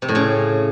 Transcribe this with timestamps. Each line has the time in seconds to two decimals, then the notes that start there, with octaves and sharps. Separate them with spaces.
0.02 C3
0.09 A2
0.15 C#3